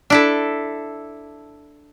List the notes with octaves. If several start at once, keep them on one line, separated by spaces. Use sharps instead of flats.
D4 E4 A4